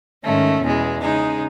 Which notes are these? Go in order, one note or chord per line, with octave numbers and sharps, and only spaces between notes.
G#2 D#3 A3 C#4
E2 B2 G#3
C#3 G#3 D#4